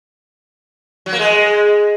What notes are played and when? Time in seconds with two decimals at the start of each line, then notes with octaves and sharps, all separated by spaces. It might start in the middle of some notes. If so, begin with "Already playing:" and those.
1.06 F#3
1.13 A#3
1.19 G#3